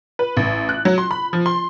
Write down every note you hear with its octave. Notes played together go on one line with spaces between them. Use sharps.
B4
A1
F#6
F#3
C6
B5
F3
C6